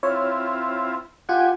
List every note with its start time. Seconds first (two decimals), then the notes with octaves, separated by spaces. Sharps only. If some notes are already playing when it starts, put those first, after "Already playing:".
0.03 C4 E4 F4 C#5
1.29 F4 G4 F#5 G#5